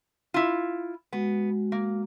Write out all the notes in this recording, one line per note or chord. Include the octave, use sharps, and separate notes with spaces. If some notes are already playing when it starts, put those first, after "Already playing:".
E4 F4
G#3 B3 F#4
A#3